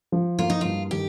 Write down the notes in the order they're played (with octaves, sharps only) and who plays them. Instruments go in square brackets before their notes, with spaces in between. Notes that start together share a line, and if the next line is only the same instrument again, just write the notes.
[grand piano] F3
[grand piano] A#3 [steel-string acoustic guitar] F4
[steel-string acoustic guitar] D#4
[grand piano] G2 [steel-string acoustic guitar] F4
[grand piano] D#3 [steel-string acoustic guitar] G4